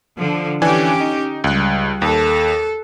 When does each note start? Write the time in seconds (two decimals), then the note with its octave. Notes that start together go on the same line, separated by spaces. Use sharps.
0.17 D3 F3
0.62 E3 C#4 D4 G4 G#5
1.00 D#4
1.44 C#2 G3 F#6
2.02 D#2 A4